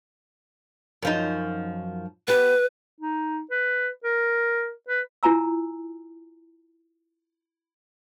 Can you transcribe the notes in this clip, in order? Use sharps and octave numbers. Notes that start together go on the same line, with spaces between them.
F#2 F3 D#4
B3 G4 B4
D#4
B4
A#4
B4
E4 F4 G#5 A#5 E6